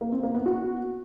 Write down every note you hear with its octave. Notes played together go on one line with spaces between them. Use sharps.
A#3
C4
A#3
B3
F#4